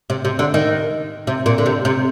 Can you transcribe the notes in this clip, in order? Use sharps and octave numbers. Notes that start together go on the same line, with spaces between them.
C3
C3
D3
D#3
C3
A#2
D3
C3
C3